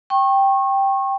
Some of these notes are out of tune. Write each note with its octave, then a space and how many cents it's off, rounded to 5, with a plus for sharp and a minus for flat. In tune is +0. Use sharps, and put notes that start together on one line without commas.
G5 +0 C#6 -30